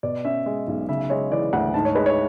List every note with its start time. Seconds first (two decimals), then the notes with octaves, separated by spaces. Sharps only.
0.03 B2 D5
0.25 C#4 E5
0.46 G#3
0.68 B1
0.89 C#3 E5
1.10 G#3 C#5
1.32 E3 D5
1.53 D2 F#5
1.74 G#2 A5
1.85 C#5
1.95 G#3 B4
2.06 C#5